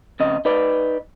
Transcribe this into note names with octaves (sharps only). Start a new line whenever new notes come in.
F2 C#3 D#5
D#4 B4 D5